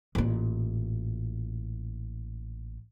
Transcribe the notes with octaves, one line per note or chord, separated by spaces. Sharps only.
A1 A#2